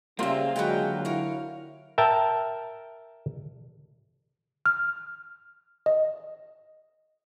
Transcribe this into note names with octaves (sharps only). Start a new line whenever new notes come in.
C#3 G3 A#3 C4 F4 E5
D3 F#3 G#3 F#4 B4 G5
E4 A#4 C#5 F5
A#4 E5 G5 A5
F6
D#5